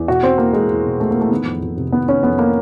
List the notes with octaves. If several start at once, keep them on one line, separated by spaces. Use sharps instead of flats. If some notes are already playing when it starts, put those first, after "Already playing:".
Already playing: E2
B2 F#4
B2 C4
E2 A#3
E2 G#3
E2
B2
B2 A3
A#3
E2 A3
D#3 B3
F2
F2
C3
D#3 B3
D#3 C#4
F2 B3
A#3